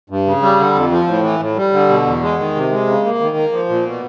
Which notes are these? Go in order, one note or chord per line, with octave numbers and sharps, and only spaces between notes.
G2
C#3
G3
D3
F2
F3
A2
E3
A2
G3
D3
B2
E2
G#3
D#3
C3
G#3
C#3
A#3
D#3
A#3
F3
A#2
B2